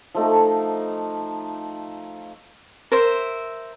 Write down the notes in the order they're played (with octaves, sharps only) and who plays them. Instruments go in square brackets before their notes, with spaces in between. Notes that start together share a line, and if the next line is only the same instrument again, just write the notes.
[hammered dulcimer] F3 A3 D#4
[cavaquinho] A#4 C5 E5